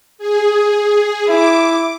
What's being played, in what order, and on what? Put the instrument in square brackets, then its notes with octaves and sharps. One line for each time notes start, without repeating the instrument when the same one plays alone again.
[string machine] G#4
[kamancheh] E4 [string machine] D6